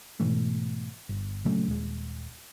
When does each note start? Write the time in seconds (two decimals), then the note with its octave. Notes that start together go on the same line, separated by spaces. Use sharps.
0.20 G#2 B2 E3 A3
1.09 G1
1.45 A#2 C#3 F#3 A3
1.68 D#1 G#3